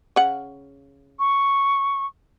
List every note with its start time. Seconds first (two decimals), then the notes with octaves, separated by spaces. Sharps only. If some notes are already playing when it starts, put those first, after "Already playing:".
0.16 C#3 F#5
1.19 C#6